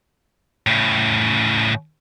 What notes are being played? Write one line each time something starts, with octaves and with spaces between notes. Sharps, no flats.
A2 C#3